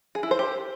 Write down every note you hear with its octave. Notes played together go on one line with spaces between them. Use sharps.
G#4
E4
C5
G4